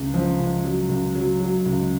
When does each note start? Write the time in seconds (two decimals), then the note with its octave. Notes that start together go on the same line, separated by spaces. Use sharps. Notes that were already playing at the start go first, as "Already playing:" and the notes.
Already playing: C#2
0.14 F3
0.40 C#2
0.65 F#3
0.89 C#2
1.15 F#3
1.40 F#3
1.66 C#2